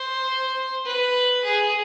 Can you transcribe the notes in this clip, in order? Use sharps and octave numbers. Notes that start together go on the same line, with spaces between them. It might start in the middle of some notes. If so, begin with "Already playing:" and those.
Already playing: C5
B4
G#4